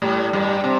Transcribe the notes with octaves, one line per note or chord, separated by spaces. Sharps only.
A2 G3
G2
C3